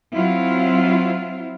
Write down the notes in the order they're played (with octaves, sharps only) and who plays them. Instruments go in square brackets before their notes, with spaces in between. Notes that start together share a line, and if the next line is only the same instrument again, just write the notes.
[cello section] F#3 C4 E4 F4